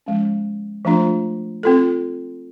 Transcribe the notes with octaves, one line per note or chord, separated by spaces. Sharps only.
F3 G#3 C#4
F3 A3 D4 F4
C4 F4 A4